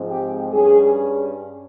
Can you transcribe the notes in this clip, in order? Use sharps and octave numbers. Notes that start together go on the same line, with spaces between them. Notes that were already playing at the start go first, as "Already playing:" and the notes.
Already playing: G#2 F3 G#3 C4
G4
G2 G3 C#4 G#4